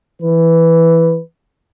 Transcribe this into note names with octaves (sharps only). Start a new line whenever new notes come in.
E3 B4